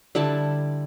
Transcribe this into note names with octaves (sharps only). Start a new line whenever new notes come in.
D3 G3 E4 A5